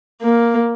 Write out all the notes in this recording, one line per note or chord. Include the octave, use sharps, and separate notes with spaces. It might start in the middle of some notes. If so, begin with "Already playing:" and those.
A#3